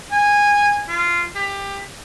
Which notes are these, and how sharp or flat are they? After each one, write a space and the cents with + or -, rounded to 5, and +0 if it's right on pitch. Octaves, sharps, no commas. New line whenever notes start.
G#5 -15
F4 -15
G4 +20